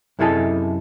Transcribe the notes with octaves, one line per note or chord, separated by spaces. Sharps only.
F#2 C3 E4 G#4 A4 D#5